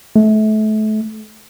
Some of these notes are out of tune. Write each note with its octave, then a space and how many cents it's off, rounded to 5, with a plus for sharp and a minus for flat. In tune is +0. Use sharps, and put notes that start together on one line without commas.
A3 -30